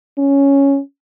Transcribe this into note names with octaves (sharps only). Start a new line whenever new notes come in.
C#4